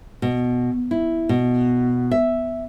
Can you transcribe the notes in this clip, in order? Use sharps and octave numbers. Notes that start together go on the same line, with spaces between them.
B2
E4
B2
E5